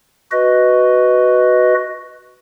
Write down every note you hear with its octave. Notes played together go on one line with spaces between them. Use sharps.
F#4 B4 D#5